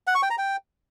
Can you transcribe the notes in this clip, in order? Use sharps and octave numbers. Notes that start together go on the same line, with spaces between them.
F#5
C#6
G5
A#5
G5